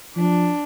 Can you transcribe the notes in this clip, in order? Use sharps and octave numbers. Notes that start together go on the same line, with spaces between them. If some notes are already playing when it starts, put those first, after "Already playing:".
F3 D4